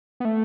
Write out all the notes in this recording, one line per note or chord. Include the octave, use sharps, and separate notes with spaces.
B3
A3